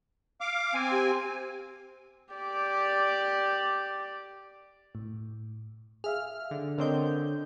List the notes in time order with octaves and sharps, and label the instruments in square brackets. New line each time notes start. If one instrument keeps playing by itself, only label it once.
[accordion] F5 D6
C4 G#5
[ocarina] G4
[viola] G4 D5
[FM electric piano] A2
[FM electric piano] G#4 E5 F5 [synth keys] F6
[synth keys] D3
[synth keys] D3 C4 G6 [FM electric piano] A#4 C#5 D#5